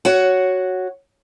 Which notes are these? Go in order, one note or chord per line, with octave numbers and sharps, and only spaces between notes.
F#4 C#5 F#5